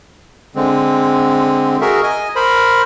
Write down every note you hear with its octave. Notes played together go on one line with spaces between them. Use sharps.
D3 G#3 C4
F#4 G#4 A#4 E5
D#5 G#5
A#4 C5 B5